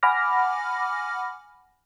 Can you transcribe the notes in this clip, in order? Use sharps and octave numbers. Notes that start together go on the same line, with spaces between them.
F#5 G#5 B5 D6 F6 A#6